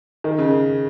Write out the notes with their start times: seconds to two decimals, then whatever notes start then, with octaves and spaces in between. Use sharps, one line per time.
0.24 D#3
0.38 C#3